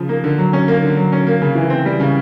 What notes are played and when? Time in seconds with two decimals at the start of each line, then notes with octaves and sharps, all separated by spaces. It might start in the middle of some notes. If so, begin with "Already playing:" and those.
Already playing: C#3 F3
0.09 A#3
0.24 D3
0.38 F#3
0.53 C#4
0.68 A#3
0.83 D3
0.97 F#3
1.12 C#4
1.27 A#3
1.42 C#3
1.55 E3
1.70 C4
1.86 G3
2.00 C#3